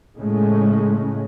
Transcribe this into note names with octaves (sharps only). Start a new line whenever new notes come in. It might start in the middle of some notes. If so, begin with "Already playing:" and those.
A2 C#3 G#3 A3 C#4